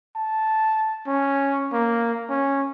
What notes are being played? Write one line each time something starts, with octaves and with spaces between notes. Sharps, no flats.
A5
C#4
A#3
C#4